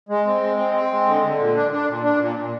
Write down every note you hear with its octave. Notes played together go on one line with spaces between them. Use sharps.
G#3
C4
G#3
C4
C4
G#3
D3
D3
A#2
D4
D4
A#2
D4
A#2
A#2